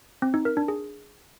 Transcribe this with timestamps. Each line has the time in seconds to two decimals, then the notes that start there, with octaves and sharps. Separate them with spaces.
0.22 C4
0.34 D#4
0.45 A#4
0.57 D4
0.68 G#4